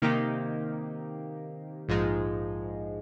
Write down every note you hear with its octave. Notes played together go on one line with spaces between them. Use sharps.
C3 D#3 A#3 D#4 G4
A#1 G#2 F3 G#3 D#4